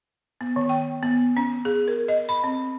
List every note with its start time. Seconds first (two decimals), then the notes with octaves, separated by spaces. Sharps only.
0.41 B3
0.56 D#3
0.69 G5
1.03 B3
1.37 C#4
1.65 G#4
1.88 A#4
2.08 D#5
2.29 B5
2.44 C4